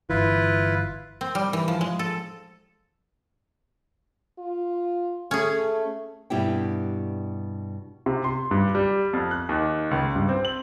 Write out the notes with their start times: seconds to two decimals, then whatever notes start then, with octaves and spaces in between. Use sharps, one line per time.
0.10 G1 E3 E4 F4 B4
1.21 C4
1.35 G3
1.53 E3
1.68 F3
1.81 G#3
1.99 A4
4.39 F4
5.31 A3 C#4 G#4
6.30 G2 B2 E4 G4 G5
8.06 C3
8.24 C6
8.51 G2
8.75 G3
9.13 F2
9.31 F#6
9.49 D#2
9.91 C#2
10.16 G2
10.29 C4
10.45 F#7